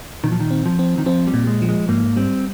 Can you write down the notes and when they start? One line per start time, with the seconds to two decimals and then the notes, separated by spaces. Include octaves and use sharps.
0.24 A#2 D#3
0.32 F3
0.40 D#3
0.51 C4
0.66 F3
0.79 C4
0.98 D#3
1.06 F3 C4
1.27 G3
1.34 A#2
1.47 G#3
1.62 F3
1.69 G#3
1.89 G#2 A#3
2.16 G3 C4